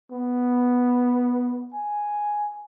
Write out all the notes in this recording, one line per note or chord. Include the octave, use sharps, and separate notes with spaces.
B3
G#5